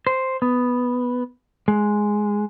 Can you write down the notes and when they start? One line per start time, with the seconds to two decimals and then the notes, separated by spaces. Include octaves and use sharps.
0.07 C5
0.42 B3
1.68 G#3